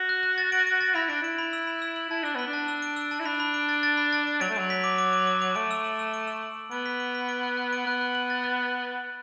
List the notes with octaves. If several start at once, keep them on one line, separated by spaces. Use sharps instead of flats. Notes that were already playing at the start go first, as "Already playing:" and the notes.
Already playing: F#4
F#6
F#6
A6
D7
D7
A6
E4 B5
D4 D7
E4 D7
B5
E6
B5
E6
F#7
E4 A5
D4 E6
B3 B6
D4
A5
E6
D7
E6
A5
E4
D4 B5
B5
D7
A6
A6
B5
A6
D7
F#3 D7
A3
F#3 D7
B6
D6
D6
D6
D6
D6
A3 D7
E6
F#7
E6
D7
E6
F#7
F#7
B3 D7
B6
D7
B6
D7
F#6
F#6
D7
B3 F#6
F#6
F#7
A6
F#6